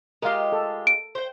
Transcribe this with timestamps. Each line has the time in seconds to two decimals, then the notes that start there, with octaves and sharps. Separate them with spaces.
0.22 G#3 F4 G4 A#4 F5
0.52 A4
0.87 D7
1.15 C5 G5